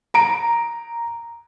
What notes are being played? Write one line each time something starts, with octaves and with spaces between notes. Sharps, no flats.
A#5 D7